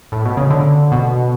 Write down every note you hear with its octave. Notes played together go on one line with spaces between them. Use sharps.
A2
B2
C#3
D3
B2